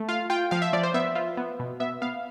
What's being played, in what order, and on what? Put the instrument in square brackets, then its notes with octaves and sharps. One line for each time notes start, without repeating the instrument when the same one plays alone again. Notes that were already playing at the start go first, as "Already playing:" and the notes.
Already playing: [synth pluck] A3
F4 F5
F4 G5
F3 F5
E5
F3 D5
C5
B3 E5
F4
B3
B2
B3 E5
B3 F5